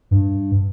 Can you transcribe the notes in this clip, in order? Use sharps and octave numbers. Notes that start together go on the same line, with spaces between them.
G2